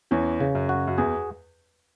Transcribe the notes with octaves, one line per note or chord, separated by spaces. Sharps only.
E2 E3 C#4
C#3
F#2 F#3
F#4
F#2
E2 G#4